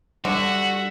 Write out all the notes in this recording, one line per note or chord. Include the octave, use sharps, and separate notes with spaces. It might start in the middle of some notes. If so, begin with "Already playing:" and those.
D3 G3 F#4 E5 F#5